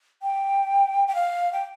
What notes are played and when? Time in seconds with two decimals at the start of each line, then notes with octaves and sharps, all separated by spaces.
0.22 G5
1.07 G5
1.15 F5
1.52 G5